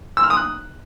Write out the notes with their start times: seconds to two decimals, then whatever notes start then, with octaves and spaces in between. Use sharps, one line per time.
0.17 E6
0.24 F6
0.30 D#6
0.37 F#6